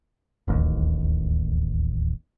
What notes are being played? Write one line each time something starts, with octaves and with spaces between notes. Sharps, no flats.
D1 A1 D#2